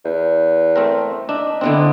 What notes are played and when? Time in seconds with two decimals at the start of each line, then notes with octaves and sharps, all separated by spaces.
0.05 E2
0.76 A3 C4 A#4
1.29 D4 D#4 E5
1.61 D3 B3 C4 D4 E4